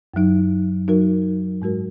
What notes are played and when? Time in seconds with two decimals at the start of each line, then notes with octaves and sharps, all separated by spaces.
0.14 F#2 F#3 D#4
0.88 F#3 D#4 F#4 A#4
1.62 G#2 G#3 F#4 A#4